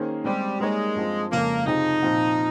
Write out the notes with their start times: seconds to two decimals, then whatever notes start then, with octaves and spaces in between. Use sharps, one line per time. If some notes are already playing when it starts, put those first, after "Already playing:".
Already playing: D#3 A#3 C#4 G#4 C5
0.24 G3 G#3 C4 G4
0.60 G3 G#3 A#3 D#4 A#4 C#5
0.95 G2 F3 C4 F4
1.31 F2 C#3 G#3 A#3
1.66 C3 F3 C4 D#4 F4 G#4
2.03 A#2 F3 C4 F4